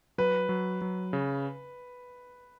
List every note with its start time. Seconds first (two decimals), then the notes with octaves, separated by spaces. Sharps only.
0.18 F#3 B4
0.49 F#3
0.82 F#3
1.13 C#3